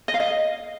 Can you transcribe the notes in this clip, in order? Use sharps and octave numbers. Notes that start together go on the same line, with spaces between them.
D#5
F5
D#5